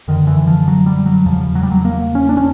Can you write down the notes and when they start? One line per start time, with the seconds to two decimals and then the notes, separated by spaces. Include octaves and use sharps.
0.08 F#2 D3 D#3
0.27 E3
0.47 F3
0.68 F#3
0.86 G3
1.06 F#3
1.26 E2 C#3 F3
1.55 F#3
1.63 G3
1.71 F#3
1.85 A#3
2.15 C#4
2.29 D4
2.37 C#4